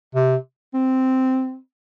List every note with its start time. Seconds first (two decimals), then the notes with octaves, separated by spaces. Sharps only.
0.15 C3
0.74 C4